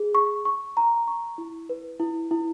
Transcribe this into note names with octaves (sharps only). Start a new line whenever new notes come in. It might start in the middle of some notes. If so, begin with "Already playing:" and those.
Already playing: G#4
C#6
C#6
A#5
C#6
E4
B4
E4
E4